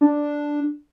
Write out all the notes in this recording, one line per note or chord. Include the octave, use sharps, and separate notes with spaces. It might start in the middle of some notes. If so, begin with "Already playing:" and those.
D4